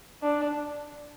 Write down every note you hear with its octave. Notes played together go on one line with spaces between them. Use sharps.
D4